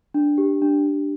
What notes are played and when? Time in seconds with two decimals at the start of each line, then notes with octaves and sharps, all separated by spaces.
0.14 D4
0.38 G4
0.62 D4
0.86 D4